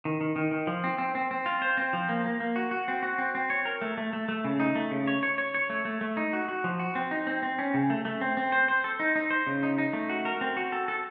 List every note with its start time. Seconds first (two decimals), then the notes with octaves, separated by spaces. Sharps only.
0.05 D#3
0.21 D#3
0.36 D#3
0.51 D#3
0.67 F3
0.84 C4
0.98 C4
1.15 C4
1.31 C4
1.46 F4
1.62 C5
1.77 C4
1.93 F3
2.09 A#3
2.25 A#3
2.40 A#3
2.56 F#4
2.71 F#4
2.88 C4
3.03 F#4
3.18 C4
3.35 C4
3.50 C#5
3.65 A#4
3.81 A3
3.98 A3
4.13 A3
4.28 A3
4.45 C#3
4.60 D#4
4.76 A3
4.91 C#3
5.08 C#5
5.23 C#5
5.38 C#5
5.54 C#5
5.70 A3
5.85 A3
6.01 A3
6.17 D#4
6.33 F#4
6.49 F#4
6.64 F3
6.79 F#4
6.95 C4
7.11 D#4
7.27 C4
7.43 C4
7.59 C#4
7.74 C#3
7.90 A3
8.05 A3
8.21 C4
8.37 C4
8.52 C5
8.68 C5
8.84 A4
9.00 D#4
9.16 D#4
9.31 C5
9.47 C#3
9.63 D#4
9.78 D#4
9.93 A3
10.09 F#4
10.25 A#4
10.41 C4
10.57 F#4
10.72 A4
10.88 A4